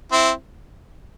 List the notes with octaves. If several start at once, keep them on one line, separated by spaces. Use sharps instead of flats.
C4 E4